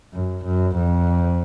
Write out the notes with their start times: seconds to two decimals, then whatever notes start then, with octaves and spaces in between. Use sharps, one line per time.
0.13 F#2
0.45 F#2
0.77 F2